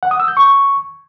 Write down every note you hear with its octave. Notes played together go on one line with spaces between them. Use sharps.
F#5
D#6
E6
G6
C#6